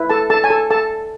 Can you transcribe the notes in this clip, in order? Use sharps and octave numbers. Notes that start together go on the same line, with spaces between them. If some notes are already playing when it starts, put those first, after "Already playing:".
Already playing: E4 B4
A4 A5
A4 A5
G#5
A4 A5
A4 A5